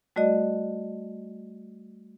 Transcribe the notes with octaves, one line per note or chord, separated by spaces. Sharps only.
G3 A3 F#4 D5 D#5